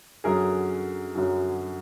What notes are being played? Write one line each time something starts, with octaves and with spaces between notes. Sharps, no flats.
F#2 D3 F#3 G#4 A#4
F#2 D3 F#3